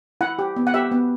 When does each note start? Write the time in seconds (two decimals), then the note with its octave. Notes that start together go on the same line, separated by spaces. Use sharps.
0.21 E4 F#5
0.39 G4
0.56 B3
0.67 F#5
0.74 G4 E5
0.91 B3